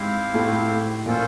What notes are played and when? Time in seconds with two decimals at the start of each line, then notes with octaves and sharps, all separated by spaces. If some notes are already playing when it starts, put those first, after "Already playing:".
Already playing: G#2 G#3 C4 E4 G4 C5 F5
0.34 A2 A3
1.06 A#2 A#3 C#4 F4 A4 C5